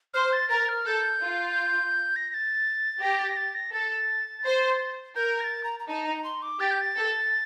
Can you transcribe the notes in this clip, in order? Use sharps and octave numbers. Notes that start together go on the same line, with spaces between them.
C5 F6
A6
A#4 A6
F6
A4 G6
F4
A#6
A#6
A6
G4 A#6
A6
A#6
A6
A#6
A4 A6
C5
A#4 G6
A#6
A6
A#5
A#5
D#4 A5
A#5
C6
D6
G4 A6
G6
A6
A4